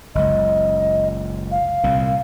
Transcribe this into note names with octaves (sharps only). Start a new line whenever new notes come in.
F#1 C#2 D#5
F5
C2 A#2